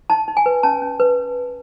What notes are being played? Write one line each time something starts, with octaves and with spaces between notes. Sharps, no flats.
D#4 A5
D#4
G#5
B4
C#4 A5
C#4
B4